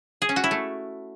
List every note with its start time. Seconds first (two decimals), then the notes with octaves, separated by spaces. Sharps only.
0.22 G#4
0.29 C#4
0.36 F#4
0.44 E4
0.51 A3